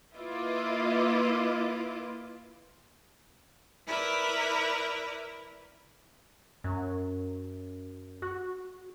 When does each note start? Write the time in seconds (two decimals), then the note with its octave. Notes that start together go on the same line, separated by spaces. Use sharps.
0.15 A#3 E4 F4 B4 D#5 D6
3.87 E4 A#4 B4 D5
6.64 F#2
8.22 F#4